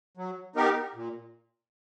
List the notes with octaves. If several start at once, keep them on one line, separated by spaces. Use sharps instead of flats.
F#3
B3 D#4 G4 A#4
A#2